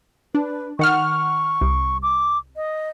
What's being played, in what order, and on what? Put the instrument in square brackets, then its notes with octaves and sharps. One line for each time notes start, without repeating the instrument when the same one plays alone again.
[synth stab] D4 [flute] B4
[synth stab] D#3 F#5 F6 [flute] C#6
[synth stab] C2
[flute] D6
D#5